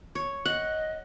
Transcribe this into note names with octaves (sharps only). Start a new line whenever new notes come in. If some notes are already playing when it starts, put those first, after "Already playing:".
C#5
D#5 F#5